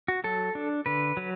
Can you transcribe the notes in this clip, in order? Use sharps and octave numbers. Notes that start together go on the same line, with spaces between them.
F#4
F#3 A4
D4
D3 B4
F#3